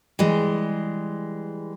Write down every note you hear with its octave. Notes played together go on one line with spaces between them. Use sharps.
E3 G3 G#3